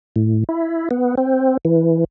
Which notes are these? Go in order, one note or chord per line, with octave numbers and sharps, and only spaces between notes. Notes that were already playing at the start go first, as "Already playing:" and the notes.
A2
E4
B3
C4
E3